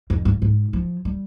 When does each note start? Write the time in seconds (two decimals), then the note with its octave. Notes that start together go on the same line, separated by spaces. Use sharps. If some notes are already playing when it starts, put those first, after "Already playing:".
0.10 F2
0.25 G2
0.42 G#2
0.73 F3
1.05 G3